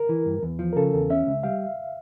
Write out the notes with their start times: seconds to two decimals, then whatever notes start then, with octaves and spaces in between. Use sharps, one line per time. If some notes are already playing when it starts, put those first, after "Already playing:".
Already playing: A#4
0.09 E3
0.26 G2
0.43 E2
0.59 F3
0.73 A#4
0.76 C#3 A4
0.93 E2
1.10 C#4 E5
1.27 C#2
1.43 G3 F5